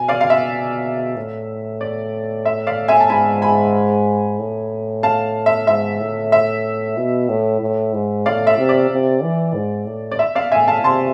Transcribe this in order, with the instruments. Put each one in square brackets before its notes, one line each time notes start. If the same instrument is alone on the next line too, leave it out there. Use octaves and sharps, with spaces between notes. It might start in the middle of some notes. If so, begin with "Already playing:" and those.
Already playing: [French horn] B2 [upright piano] G#5
[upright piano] D5 F5
F5
E5
[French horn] A2
[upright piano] D5
E5
D5 F5
E5 G#5
A5
[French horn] G#2 [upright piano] G#5 B5
[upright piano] G#5 B5
[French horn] A2
[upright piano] F5 A5
E5
[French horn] G#2 [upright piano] E5
[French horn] A2
[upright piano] E5
[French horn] B2
A2
A2
G#2
[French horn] A2 [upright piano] D5 F5
[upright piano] E5
[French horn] C3
[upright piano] D5
[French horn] C3
E3
G#2
A2
[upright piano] D5
E5
D5 F5
[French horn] A2 [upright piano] E5 G#5
[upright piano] F5 A5
[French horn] C3 [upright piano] A5 C6